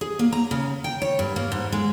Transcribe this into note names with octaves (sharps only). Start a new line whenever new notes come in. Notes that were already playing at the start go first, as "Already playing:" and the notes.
G#4
A#3
A#5
C#3
G5
C#5
G2
A#3
G#2
G#3